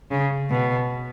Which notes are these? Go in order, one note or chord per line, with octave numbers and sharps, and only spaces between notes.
C#3
B2